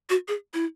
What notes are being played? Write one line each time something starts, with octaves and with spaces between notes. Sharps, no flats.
F#4
G#4
E4